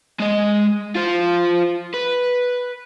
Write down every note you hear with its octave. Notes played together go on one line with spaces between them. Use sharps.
G#3 D#5
F4 C5
B4